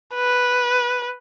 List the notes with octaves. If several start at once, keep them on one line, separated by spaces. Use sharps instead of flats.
B4